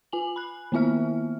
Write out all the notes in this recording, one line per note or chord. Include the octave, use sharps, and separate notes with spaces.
F4 G#5 F#7
B5 F#6
D#3 A#3 B3 E4 E5 F6